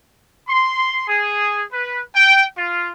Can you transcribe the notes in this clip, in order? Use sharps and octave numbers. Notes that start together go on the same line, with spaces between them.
C6
G#4
B4
G5
F4